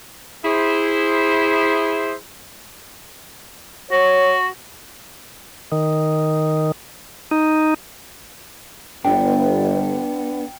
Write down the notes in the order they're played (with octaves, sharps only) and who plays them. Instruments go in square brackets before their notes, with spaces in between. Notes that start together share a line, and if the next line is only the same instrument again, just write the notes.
[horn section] E4 G#4 C5
[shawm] F#4 [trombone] C#5
[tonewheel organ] D#3
D#4
[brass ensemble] G1 G2 [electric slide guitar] B3 D4 [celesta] G5